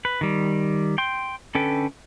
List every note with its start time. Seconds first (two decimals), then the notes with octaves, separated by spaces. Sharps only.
0.05 B4
0.21 D#3 G3
0.98 G5 C6
1.55 D3 C#4 A4 B4 G5